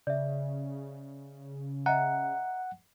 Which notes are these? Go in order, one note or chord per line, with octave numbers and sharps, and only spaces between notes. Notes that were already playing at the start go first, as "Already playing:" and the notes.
C#3 D5 E5
D#5 E5 F#5 A#5